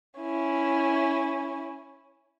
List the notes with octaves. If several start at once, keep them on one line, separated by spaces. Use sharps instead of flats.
C#4 E4